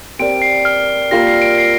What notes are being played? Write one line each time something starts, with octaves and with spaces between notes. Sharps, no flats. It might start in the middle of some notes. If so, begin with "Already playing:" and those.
C4 G4 A#4 D5 D7
C7
F6
G3 A#3 F4 A#4 A#6
C7
D7
C7